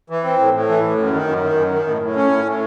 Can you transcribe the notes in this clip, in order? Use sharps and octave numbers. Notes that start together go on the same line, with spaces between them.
E3
C4
A2
A2
E3
A2
F#2
D#3
F#2
D#3
F#2
D#3
A2
A2
C#4
A2
A2